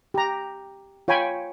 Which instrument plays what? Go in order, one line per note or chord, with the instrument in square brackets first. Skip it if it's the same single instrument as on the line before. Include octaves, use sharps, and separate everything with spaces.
[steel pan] G4 A#5
F4 C#5 G5 G#5 B5